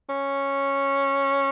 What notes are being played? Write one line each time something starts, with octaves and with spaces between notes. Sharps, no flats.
C#4